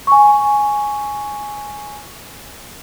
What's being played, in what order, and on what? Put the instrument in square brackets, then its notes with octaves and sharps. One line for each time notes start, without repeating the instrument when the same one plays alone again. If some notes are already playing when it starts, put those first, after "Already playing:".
[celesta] G#5 C#6